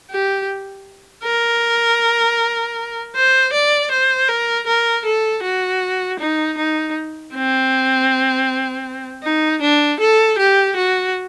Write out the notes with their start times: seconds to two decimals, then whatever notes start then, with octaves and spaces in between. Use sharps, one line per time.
0.11 G4
1.24 A#4
3.15 C5
3.53 D5
3.91 C5
4.28 A#4
4.67 A#4
5.05 A4
5.43 F#4
6.19 D#4
6.57 D#4
7.33 C4
9.23 D#4
9.62 D4
10.00 A4
10.38 G4
10.76 F#4